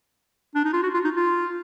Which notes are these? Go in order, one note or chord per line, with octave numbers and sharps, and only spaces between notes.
D4
D#4
F4
F#4
F4
D#4
F4